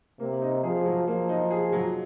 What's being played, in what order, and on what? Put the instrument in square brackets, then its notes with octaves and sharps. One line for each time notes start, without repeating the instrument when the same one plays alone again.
[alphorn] C3 [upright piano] A#3
[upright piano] D#4
[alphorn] F3 [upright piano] G#4
[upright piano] F#3
[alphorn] F3 [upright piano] A#3
[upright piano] D#4
G#4
F#3